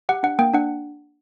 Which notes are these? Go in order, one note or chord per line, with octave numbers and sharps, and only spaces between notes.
G4 F#5
D4 F#5
A#3 G5
D4 F#5